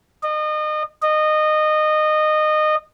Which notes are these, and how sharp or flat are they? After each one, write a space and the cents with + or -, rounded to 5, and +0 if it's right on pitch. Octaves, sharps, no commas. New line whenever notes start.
D#5 -30
D#5 -20